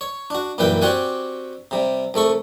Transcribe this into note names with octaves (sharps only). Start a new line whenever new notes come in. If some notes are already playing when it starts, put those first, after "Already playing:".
C#5
D4 F#4
F#2 A#2 E3 G3 B4 G5
C4 F#4 G4 D5 F#5 G#5
C3 G3
C2 A3 A4 C#6